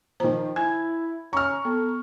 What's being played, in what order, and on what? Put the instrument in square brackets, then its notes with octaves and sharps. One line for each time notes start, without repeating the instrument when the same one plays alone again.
[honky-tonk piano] D#3 F3 [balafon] C5 A#5
[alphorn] E4 [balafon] G#5 [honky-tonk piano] G#6
[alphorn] C#4 [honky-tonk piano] A#5 [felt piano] C#6 F6
[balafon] B3 [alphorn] A4